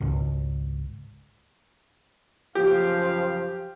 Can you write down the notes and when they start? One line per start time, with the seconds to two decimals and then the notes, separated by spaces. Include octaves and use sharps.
0.01 G#1 C#2
2.55 F#2 C#3 F3 G4 F5